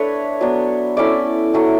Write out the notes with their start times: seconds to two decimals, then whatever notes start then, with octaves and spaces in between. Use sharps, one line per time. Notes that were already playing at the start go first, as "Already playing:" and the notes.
Already playing: A3 D4 B4 C#5
0.41 F#3 B3 D4
0.97 A3 C#4 E4 D5
1.53 F#3 A3 C#4